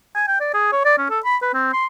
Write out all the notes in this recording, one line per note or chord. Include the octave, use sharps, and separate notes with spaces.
G#5
G5
D5
G#4
C#5
D5
C#4
A4
B5
B4
C4
C6